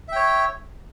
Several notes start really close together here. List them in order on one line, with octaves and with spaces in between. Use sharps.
E5 G5 C#5